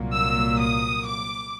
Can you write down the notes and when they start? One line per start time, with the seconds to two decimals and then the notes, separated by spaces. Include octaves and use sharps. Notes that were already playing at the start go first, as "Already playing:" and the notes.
Already playing: C2 A#2 F#3 A#3
0.14 E6
0.59 D#6
1.05 D6